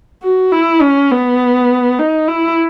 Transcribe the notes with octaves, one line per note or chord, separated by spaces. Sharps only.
F#4
E4
C#4
B3
D#4
E4